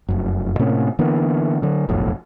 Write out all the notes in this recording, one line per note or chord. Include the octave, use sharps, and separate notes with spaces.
F1 F#2
A2 C3 A#3 C#4
D3 E3 A#3 B3
D3 F#3
F#1 B1 F2 A2